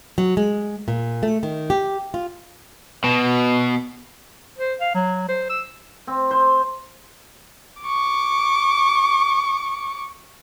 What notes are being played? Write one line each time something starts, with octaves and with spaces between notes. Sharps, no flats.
F#3
G#3
A#2
A3
D#3
G4
F4
B2
C5
F5
F#3
C5
E6
C4
C5
C#6 D6